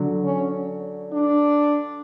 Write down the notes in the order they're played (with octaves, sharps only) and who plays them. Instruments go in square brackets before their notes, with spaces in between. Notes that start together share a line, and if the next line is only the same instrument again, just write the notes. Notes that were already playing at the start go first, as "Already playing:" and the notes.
Already playing: [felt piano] D3 F#3
[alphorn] C#4
D4